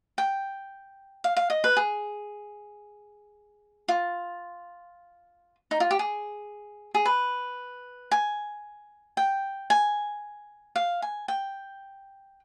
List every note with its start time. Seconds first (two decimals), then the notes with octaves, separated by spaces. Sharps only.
0.18 G5
1.24 F5
1.37 F5
1.50 D#5
1.64 B4
1.77 G#4
3.88 F4
5.71 D#4
5.80 F4
5.91 G4
5.99 G#4
6.94 G#4
7.05 B4
8.11 G#5
9.17 G5
9.70 G#5
10.76 F5
11.02 G#5
11.28 G5